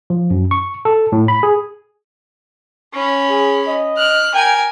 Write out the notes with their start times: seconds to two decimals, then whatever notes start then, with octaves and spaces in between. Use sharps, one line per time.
0.10 F3
0.31 F#2
0.51 C#6
0.85 A4
1.12 A2
1.28 B5
1.43 G#4
2.93 C#4 B5
3.30 G#4
3.67 D#5
3.97 F6 F#6
4.34 A#4 G5 G#5